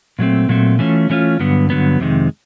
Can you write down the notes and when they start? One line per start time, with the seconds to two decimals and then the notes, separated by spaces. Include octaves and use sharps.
0.19 A#2 F#3 A3 C4
0.49 A#2 F#3 A3 C4
0.79 E3 A3 C#4 F4
1.10 E3 A3 C#4 F4
1.39 G2 D3 F#3 B3
1.70 G2 D3 F#3 B3
2.00 F2 C3 D#3 G#3